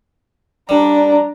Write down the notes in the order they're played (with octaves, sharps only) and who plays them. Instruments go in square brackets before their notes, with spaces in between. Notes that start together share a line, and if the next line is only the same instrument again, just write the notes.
[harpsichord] G3 [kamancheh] D4 A#5